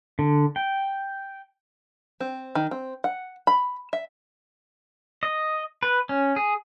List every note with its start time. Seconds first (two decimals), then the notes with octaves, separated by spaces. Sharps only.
0.19 D3
0.56 G5
2.20 C4
2.55 D#3
2.71 C4
3.04 F#5
3.47 B5
3.93 E5
5.23 D#5
5.83 B4
6.09 C#4
6.36 G#4